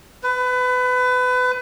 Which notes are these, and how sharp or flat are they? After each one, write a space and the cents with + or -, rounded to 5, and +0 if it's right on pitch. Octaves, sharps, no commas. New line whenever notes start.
B4 +25